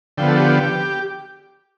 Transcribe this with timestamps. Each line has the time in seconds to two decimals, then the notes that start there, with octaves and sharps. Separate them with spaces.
0.17 D3 F3 B3 G5
0.28 A4
0.37 G4